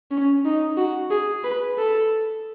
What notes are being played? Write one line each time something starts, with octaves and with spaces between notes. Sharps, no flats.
C#4
D#4
F#4
G#4
B4
A4